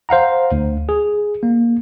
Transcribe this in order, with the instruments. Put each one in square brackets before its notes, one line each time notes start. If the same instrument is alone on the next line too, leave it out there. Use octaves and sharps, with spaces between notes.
[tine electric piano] C5 F5 F#5 A#5
D2
G#4
A#3